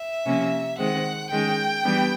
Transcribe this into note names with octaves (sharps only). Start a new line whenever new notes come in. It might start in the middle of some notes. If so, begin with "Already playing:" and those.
Already playing: E5
C3 F3 A#3 C#4
D#3 G#3 C4 F#5
D#3 G#3 C#4 G5
E3 G3 B3 D4